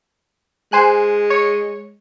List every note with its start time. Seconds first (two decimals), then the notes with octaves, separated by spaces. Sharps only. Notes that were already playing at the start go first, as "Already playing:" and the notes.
0.72 G#3 C5 G#5 F#6
1.30 C#5